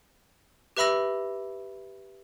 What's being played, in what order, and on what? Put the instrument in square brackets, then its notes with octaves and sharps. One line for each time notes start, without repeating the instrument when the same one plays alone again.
[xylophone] G4 B4 E5 B5 E6 A#6